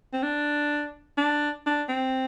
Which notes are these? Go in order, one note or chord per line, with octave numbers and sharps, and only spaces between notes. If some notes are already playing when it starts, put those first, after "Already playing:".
C4
D4
D4
D4
C4